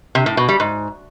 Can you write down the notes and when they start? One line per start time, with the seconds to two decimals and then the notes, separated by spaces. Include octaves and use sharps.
0.15 C3
0.26 A2
0.37 B2
0.49 G3
0.60 G#2